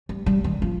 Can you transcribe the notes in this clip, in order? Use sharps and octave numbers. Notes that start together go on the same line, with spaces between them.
G3
G3
D#3
F3